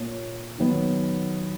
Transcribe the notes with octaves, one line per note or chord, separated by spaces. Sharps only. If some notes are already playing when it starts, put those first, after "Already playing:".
Already playing: A#2 A#3 C#5
D#3 F#3 B3